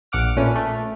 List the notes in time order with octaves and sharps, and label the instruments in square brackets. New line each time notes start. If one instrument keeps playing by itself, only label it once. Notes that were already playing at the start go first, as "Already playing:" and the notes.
[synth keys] A#1 F#5 D6 F6
A#2 A3 C#4 B4
A3